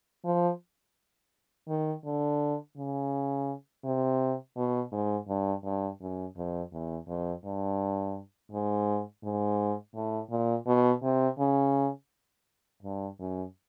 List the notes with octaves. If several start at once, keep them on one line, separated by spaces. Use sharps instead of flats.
F3
D#3
D3
C#3
C3
B2
G#2
G2
G2
F#2
F2
E2
F2
G2
G#2
G#2
A2
A#2
B2
C3
C#3
G2
F#2